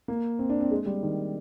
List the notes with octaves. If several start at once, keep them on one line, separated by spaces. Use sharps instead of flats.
A#3
C4
D4
C4
G#3
G3
D#3